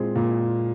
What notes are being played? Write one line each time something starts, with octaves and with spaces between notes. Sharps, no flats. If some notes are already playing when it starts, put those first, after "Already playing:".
Already playing: A#2 G#3 C4
A#2